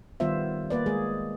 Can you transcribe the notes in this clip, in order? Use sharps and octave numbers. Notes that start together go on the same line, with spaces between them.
D#3 G3 B3 F4 C5 E5
A#3 B4 D5
G#3 G#4